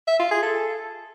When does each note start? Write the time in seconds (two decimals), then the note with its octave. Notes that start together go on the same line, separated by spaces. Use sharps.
0.08 E5
0.19 F4
0.31 G#4
0.43 A4